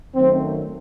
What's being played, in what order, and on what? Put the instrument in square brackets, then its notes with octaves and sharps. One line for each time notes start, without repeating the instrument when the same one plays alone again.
[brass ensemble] F#2 D#3 F#3 A3 C4